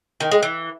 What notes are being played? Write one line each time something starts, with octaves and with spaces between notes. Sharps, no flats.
D#3
G#3
E3